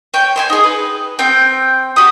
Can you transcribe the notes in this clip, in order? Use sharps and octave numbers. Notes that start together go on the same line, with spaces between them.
C#5 G5
C5 E5 G#5
D#4 G#4
B4
C4 G5
F#4 G4 D#6